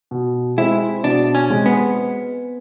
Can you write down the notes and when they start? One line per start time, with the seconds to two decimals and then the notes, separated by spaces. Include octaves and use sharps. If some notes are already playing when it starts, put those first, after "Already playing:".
0.11 B2
0.57 G#3 C4 E4
1.04 B2 D4
1.35 C#4
1.50 G#3 C4
1.66 B3